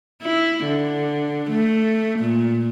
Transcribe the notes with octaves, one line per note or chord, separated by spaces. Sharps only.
E4
D3
A3
A#2